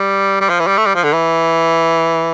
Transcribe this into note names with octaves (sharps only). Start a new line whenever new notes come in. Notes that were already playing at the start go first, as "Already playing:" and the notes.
Already playing: G3
G3
F3
E3
G3
A3
G3
F3
D3
E3